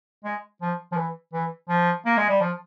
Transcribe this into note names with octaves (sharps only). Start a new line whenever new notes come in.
G#3
F3
F3
E3
E3
F3
A#3
G#3
G3
F3